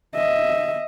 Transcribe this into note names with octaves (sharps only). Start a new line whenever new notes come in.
D#5 E5